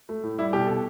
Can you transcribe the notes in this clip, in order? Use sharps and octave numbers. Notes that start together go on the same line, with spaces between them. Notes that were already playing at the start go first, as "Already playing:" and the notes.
A3
A2
G3 E4
B2 G4
B2 A4